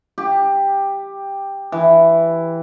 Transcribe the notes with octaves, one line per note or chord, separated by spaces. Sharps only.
G4
E3